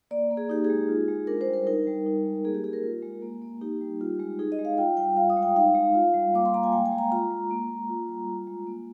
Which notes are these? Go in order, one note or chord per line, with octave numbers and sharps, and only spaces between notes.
A#3 D5
A#3
G#4
D#4 G4
G#4
G#3
F4
G#3
D4 A#4
C5
G3
A#4
D#4 A#4
G3
D#4
G#3
A#3 G#4
G4
A#3 G#4
A#4
F4
G#3
A#3
A#3
D#4 G4
G3
F4
G#3
D#4 G#4
D#5
G#3
F5
F4 G5
G3 G5
F4 F5
D#6
G#3
G5
D#4 F5
G#3
F4
G3
A#3 D6
C6
A#3 A#5
G#5
G#3 G5
G#5
G#3
A#5
F4 A#5
G#3
A#3
A#3
F4
G3
F4
G#3
A#3